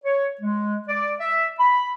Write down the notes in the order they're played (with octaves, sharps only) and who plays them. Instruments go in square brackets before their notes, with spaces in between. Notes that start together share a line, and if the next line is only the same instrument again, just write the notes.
[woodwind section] C#5
G#3
D5
E5
B5